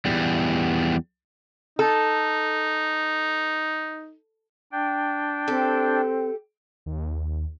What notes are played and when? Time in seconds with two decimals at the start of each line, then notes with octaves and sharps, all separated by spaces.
0.06 E2 G3
1.79 D#4 A4
4.72 D4 G5
5.48 C4 G4 A4
6.86 D#2